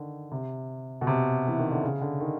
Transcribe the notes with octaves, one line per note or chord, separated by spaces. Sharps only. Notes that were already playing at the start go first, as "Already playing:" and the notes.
Already playing: D3 D#3
C3
B2
C3
E3
D#3
D3
C#3
D3
D#3